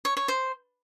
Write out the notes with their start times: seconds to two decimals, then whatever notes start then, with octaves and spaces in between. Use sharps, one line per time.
0.05 C#5
0.17 C#5
0.28 C5